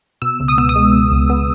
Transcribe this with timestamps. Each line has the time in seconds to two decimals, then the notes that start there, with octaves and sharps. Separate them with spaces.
0.22 B2 E6
0.40 C#2
0.48 D#6
0.58 B3 E6
0.69 D#6
0.75 G#3
0.93 B2
1.12 C#2
1.30 B3